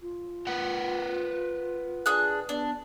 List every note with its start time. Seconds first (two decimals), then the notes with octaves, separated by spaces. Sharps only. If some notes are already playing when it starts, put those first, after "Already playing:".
0.01 F4
0.47 A#4 B4 F#5
2.06 D4 G#4 F#6
2.49 B3 D4